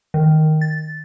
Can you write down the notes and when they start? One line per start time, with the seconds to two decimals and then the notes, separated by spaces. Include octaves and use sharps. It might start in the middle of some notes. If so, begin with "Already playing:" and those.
0.14 D#3
0.61 A6